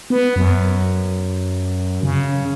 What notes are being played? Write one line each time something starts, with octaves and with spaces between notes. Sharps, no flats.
B3
F#2
C#3